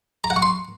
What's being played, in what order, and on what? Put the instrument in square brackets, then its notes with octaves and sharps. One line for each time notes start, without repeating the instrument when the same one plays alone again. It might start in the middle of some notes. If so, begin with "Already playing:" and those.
[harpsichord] A#5
F#5
C#6
C6